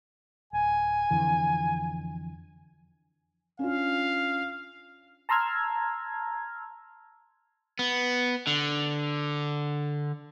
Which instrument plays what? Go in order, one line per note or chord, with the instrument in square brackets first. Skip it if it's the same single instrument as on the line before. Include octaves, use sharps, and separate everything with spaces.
[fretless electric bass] D1 [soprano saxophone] G#5
[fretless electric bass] F2 D3 E3
[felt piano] C#4 D4 F4 [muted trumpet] F5
[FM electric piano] A5 A#5 C6 E6 F6 G#6
[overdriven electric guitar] B3
D3